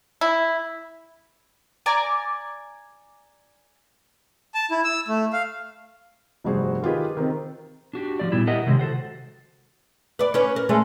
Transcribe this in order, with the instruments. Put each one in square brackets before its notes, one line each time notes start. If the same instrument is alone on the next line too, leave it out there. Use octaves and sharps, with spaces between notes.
[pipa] E4
[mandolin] D5 G#5 A#5 D6
[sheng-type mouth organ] A5
E4
E6
A3
F5
[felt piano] F1 G2 F#4 G#4 C5
D#3 F4 G4 G#4 B4
D#3 C4 D#4
[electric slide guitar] D4 F#4 G4
F3 G3 D5
A#2 G3 B3 E4
G4 A#4 D#5 E5 F#5
C3 D#3 F#3 G#3
F#4 A4 C5 F#5
[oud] B4 D5
C#4 B4 C#5
A#4
G#3 A3 C#4